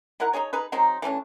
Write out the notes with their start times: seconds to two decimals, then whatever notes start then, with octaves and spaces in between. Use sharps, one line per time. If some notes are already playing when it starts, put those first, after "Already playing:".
0.20 D#3 E4 A#4 F#5
0.33 D#4 F#4 G#4 C#5
0.53 D#4 G#4 B4
0.72 F#3 G#3 C4 D#4
1.02 E3 A3 C#4 D4